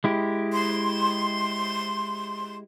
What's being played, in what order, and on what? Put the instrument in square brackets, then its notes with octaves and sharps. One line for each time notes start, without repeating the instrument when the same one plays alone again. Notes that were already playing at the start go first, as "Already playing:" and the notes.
[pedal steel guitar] G#3 E4 G4
[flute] C6